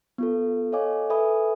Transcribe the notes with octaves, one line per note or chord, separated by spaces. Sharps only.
B3 F4 A4
A4 C#5 D#5 F5 G#5 D6
A4 B4 E5 G#5 B5 D#6